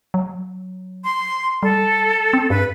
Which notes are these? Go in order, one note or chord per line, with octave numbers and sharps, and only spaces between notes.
F#3
C6
G3 A4
C4
G2 B4